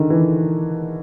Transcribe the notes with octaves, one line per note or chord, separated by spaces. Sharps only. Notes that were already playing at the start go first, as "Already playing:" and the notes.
Already playing: D3 D#3
E3